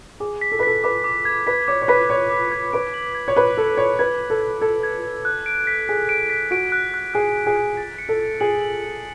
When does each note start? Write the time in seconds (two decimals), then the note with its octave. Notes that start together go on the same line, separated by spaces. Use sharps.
0.20 G#4 D6
0.41 B6
0.52 A4
0.59 B4
0.63 A4 B6
0.84 B4 D6
1.04 D6
1.25 G#6
1.47 B4 B6
1.68 C#5 D6
1.82 C#5
1.88 B4 B6
2.10 C#5 G#6
2.30 D6
2.52 G#6
2.73 B4 D7
2.94 F#7
3.15 G#6
3.28 C#5
3.36 B4 G#6
3.57 A4 F#7
3.77 C#5 G#6
3.99 B4 G#6
4.20 G#6
4.30 A4
4.41 G#6
4.61 A4 G#6
4.83 G#6
5.04 G#6
5.25 F#6
5.46 D7
5.67 B6
5.88 G#4 B6
6.09 D7
6.30 B6
6.51 F#4 D7
6.72 F#6
6.94 F#6
7.14 G#4 F#6
7.35 B6
7.46 G#4
7.56 F#6
7.77 A6
7.99 C#7
8.09 A4
8.20 A6
8.40 G#4 F#7
8.61 F#7
8.82 C#7